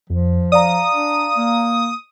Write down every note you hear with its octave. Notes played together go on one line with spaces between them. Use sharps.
F2 F3
D5 F5 A#5 D#6
D4
A#3